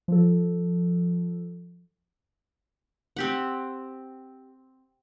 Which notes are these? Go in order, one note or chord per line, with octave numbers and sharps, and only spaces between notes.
F3 A4
C4 G4 F#5